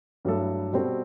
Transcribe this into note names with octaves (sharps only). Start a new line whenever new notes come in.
G2 F#3 A3 E4 A4
B2 G3 C4 F#4 A4